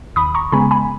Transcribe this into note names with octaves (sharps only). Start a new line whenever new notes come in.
D#2 B5 D#6
A#5 C#6
C#3 G#3 B3 G#5 B5
G#5 B5